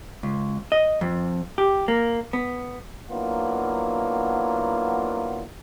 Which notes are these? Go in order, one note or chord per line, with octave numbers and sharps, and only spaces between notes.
C#2
D#5
F2
G4
A#3
B3
F#3 A#3 B3 D4 E4 F4